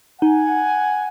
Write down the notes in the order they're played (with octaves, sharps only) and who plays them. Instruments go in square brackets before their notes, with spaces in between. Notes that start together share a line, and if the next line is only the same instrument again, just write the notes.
[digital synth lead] D#4 [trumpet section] F#5 G#5